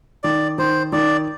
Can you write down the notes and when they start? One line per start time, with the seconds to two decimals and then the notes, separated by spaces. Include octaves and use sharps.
0.24 D#3 D5
0.58 D#3 C5
0.92 D#3 D5